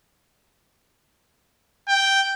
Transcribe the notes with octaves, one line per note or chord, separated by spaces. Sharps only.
G5